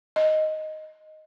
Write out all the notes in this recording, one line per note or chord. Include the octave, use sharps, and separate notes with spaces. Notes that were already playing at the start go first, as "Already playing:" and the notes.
D#5